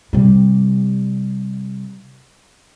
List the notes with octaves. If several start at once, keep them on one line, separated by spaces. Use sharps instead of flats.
C3 G3